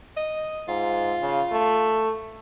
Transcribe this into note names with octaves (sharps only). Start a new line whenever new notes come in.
D#5
G#2 F4
C#3
A3